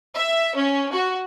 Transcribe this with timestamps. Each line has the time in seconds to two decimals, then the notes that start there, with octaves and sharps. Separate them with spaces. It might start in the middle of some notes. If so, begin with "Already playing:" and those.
0.15 E5
0.54 C#4
0.92 F#4